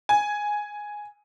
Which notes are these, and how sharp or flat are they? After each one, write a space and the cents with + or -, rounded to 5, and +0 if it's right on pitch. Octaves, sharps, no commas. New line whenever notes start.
G#5 +0